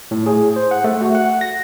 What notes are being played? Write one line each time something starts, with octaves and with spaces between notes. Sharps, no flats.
A2
G#4
C5
F#5
A3
F#4
F#5
A#6